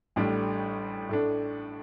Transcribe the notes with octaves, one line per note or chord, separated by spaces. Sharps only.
A1 A2 G3 D4
A2 A3 D4